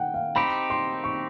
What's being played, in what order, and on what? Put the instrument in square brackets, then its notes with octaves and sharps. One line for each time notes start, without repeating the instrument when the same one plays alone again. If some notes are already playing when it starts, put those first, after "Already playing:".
Already playing: [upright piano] F#5 G5
F5
[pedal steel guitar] C4 D#4 G4 [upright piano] B5
[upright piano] C6
C#6